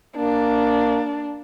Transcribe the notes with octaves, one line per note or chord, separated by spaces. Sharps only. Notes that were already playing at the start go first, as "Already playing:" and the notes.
A#3 D4